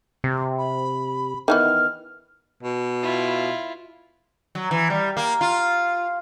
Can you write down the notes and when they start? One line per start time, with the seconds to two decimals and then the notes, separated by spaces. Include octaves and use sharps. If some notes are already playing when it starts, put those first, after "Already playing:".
0.24 C3
0.58 B5
1.48 D#3 E3 B3 F6
2.63 B2
3.03 E4 F4
4.55 F#3
4.71 E3
4.90 G3
5.17 A#3
5.41 F4